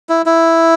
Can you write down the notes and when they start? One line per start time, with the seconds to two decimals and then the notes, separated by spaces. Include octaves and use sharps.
0.09 E4
0.26 E4